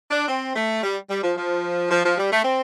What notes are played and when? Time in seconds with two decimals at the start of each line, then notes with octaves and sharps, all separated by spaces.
0.11 D4
0.28 C4
0.55 A3
0.82 G3
1.09 G3
1.23 F3
1.37 F3
1.90 F3
2.04 F3
2.17 G3
2.31 A3
2.44 C4